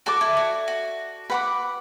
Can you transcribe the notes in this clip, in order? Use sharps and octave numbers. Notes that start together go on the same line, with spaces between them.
F#4 A4 D5 A5 D6
E4
F#4
F#4
B4 F#5 B5 D6